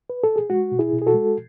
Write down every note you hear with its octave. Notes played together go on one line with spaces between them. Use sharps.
B4
A4
G#4
G#3 F#4
B2
E4 G#4
B2
G#4
F#4 A4
G#3